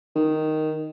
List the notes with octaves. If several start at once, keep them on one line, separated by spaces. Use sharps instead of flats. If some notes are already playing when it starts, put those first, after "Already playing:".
D#3